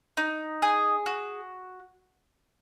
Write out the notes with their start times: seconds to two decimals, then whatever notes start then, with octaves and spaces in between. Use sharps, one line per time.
0.17 D#4
0.62 G#4
1.06 F#4